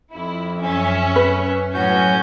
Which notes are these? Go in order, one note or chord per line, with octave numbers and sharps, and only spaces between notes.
F2 E4
F#2 C#4 E5
B4
A2 F#3 C#4 F#4 G6